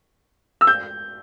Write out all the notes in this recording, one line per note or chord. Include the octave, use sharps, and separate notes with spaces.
E6
G6